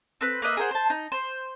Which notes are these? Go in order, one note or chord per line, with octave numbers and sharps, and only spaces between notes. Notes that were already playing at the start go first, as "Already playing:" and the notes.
C4 B4
A#3 B4 D#5 E5
G#4 A#4 C5 F#5
C5 A5
D#4
C5